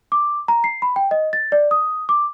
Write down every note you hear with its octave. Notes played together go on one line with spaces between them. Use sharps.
D6
A#5
C7
B5
G5
D#5
A6
D5
D#6
D6